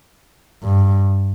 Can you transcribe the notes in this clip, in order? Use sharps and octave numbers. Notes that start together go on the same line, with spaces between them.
G2